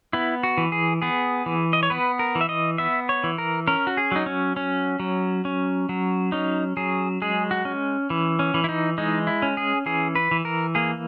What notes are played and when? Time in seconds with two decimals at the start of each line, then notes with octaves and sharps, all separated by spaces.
0.13 B3 E4
0.43 F#4
0.58 E3
0.72 G#4
1.02 B3 G#4
1.46 E3
1.73 D#5
1.83 C#5
1.90 B3 B4
2.19 A#4
2.35 E3
2.41 E5
2.49 D#5
2.78 B3 E5
3.09 C#5
3.24 E3
3.38 A#4
3.67 C#4 A#4
3.87 F#4
3.97 G#4
4.12 F#3 D#4
4.26 C#4
4.56 C#4
5.00 F#3
5.45 C#4
5.89 F#3
6.32 C#4 D#4
6.77 F#3 G#4
7.22 G#3 G#4
7.51 F#4
7.65 C#4
8.10 E3
8.39 C#4
8.54 E3
8.64 E4
8.69 D#4
8.98 G#3 D#4
9.27 E4
9.42 C#4
9.57 G#4
9.86 E3 G#4
10.15 B4
10.31 E3
10.45 A#4
10.75 A#3 G#4